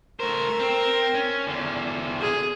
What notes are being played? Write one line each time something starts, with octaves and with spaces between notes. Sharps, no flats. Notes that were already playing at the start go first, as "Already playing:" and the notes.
A3 A#4 C5
C4
C#4
E2 D3
G#4